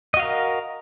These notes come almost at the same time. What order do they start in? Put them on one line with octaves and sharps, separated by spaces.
D#5 F#4 F5 A#4